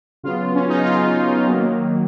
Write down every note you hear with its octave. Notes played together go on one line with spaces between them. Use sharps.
C#3 F#3 B3 F4
C#4
D#4
F4
D#3 F#3 A#3